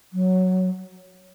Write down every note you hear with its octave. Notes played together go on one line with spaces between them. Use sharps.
F#3